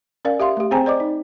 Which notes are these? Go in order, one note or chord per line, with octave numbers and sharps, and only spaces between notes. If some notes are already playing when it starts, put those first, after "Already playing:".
C#4 A#4 D5 F5
G4 E5 F5 C6
A3 G4
C4 G#4 C5 G5 G#5 A#5
C5 D5 D#5 D6
D#4